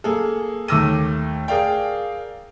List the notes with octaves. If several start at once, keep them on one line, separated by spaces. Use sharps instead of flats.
A#3 G#4 A4
D#2 A3 D6 E6 A#6 D#7
G#4 A#4 D5 F5 G5